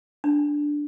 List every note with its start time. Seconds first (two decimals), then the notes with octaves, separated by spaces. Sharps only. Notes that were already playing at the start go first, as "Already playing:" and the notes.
0.24 D4